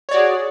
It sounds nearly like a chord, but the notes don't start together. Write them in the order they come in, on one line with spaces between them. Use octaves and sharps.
C#5 D5 F#4 G#4